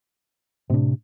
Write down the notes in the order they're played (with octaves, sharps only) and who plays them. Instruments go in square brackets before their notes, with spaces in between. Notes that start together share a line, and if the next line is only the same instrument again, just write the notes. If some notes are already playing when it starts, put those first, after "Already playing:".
[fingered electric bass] A2 D4 [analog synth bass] C3